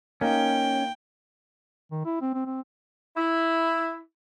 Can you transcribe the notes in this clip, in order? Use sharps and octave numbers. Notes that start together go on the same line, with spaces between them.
A#3 C#4 D#4 G5
D#3
E4
C4
C4
C4
E4